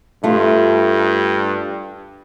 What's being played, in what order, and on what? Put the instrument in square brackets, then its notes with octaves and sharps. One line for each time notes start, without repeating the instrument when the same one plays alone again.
[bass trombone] G2 [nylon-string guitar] A3 F4